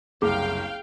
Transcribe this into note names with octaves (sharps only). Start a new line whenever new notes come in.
F#1 C2 G#4 F5 G5